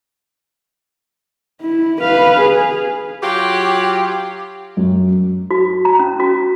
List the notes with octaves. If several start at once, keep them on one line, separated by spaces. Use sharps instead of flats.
E4
B4 F5
G#4
F#3 F4 G4
F#2
F#4
A#5
C#4
F#4